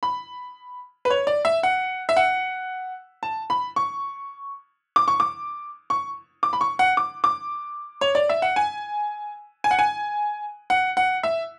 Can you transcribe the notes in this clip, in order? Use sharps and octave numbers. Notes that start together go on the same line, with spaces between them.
B5
B4
C#5
D5
E5
F#5
E5
F#5
A5
B5
C#6
D6
C#6
D6
C#6
D6
B5
C#6
F#5
D6
D6
C#5
D5
E5
F#5
G#5
G#5
F#5
G#5
F#5
F#5
E5